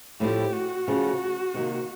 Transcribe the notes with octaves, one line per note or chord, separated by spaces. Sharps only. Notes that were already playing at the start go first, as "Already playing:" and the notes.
A2 F3 A3 C4 E4 G4
F#4
C#3 F3 A3
C3 D#3 G3 A#3